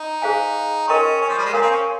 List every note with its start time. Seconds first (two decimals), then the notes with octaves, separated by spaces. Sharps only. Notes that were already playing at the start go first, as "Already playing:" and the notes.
Already playing: D#4
0.22 G#4 C5 F5 G#5
0.88 C#4 A#4 D#5 G5 C6
1.21 C#4
1.29 F3
1.38 G3
1.45 G#3
1.53 A#3 A#4 C#5 F5 G#5
1.62 C4
1.70 C#4